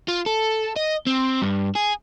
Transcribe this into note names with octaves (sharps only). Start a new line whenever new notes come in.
F4
A4
D#5
C4
G2
G#4